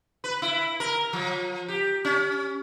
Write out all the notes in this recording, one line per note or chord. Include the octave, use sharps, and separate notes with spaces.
B4
E4
A#4
F3
G4
C#4